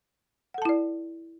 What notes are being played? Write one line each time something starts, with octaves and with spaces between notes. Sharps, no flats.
E4 A4 D5 F#5 A5